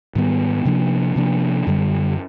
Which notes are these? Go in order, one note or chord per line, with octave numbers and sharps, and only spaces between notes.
G#2 D#3 G3 B3
C3 F3 A#3 D4
C3 F3 A#3 D4
F#2 D3 G3